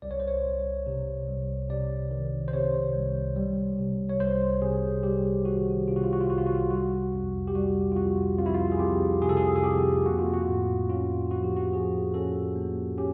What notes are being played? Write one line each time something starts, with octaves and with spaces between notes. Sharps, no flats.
C2 D5
C#5
C5
C#5
C2
C3
C2
C3 D5
D#3
C5
C3 C#5
C2
G3
C3
C#5
C2 C5
C3 G#4
G3 G4
D#3 F#4
C3 F4
F#4
F4
F#4
F4
C2 F#4
F4
F#4
F4
G3 F#4
F2
G4
G3 F#4
F4
F2 F#4
F2 F4
E4
F4
G#4
F2 G4
C3 G#4
A4
G#4
G#4
F2 G4
A#3 F#4
F4
F#4
A2
C#4 F4
F3 F#4
G4
F#4
F3 G#4
C#4 A4
A#3
C#4 G4